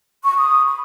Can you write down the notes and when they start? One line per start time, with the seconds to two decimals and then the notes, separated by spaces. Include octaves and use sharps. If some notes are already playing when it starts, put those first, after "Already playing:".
0.23 C#6
0.38 D#6
0.68 B5